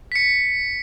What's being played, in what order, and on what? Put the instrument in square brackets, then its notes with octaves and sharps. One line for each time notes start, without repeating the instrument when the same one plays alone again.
[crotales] B6 C#7